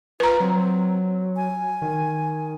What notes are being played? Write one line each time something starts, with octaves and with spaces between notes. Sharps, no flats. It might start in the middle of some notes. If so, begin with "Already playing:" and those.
F4 B4 A#5
F#3 C4
G#5
D#3